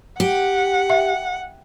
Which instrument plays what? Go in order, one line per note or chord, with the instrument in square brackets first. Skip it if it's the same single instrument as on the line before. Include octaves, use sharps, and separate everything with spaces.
[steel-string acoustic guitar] G4 [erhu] F#5
[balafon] E5